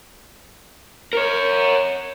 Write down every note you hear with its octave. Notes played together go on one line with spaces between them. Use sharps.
A#4 C#5